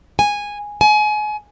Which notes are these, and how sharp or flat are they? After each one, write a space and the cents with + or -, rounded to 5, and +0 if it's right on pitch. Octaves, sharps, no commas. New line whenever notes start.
G#5 -10
G#5 +30